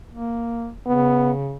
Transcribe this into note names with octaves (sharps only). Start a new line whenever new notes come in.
A#3
C#3 B3